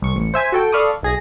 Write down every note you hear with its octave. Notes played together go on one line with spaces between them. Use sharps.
C2 C#6
A1 C#7
C5 E5 G#5
F#4 A4 G5
A4 D5 F5 B5 C#6 D#6
B1 G#4 A#6